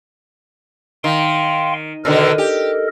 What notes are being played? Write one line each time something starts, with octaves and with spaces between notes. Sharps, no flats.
D#3 F5 G5 C6
B2 D3 D#3 A4 A#4 D#5
G4